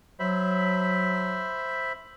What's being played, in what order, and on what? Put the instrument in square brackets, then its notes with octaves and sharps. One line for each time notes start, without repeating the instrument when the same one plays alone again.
[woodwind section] F#3 [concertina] C5 E5 B5